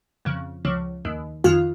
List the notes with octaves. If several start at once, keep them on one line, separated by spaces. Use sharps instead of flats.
F2 C#3 F3
C#2 C#3 F3
D#2 D#3
F2 D#3 F4 F5